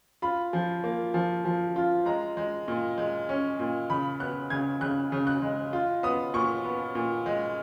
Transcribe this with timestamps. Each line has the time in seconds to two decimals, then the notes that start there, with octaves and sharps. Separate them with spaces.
0.22 F4 B5
0.53 F3
0.84 A#3
1.14 F3
1.45 F3
1.76 F4
2.06 G#3 A#5
2.37 G#3
2.68 A#2
2.98 G#3
3.29 C#4
3.59 A#2
3.90 C#3 B5
4.20 B3 F#6
4.50 C#3 G#6
4.81 C#3 F#6
5.12 C#3
5.27 F#6
5.42 G#3
5.73 F4
6.03 B3 D#6
6.34 A#2 C#6
6.65 B3
6.95 A#2
7.26 G#3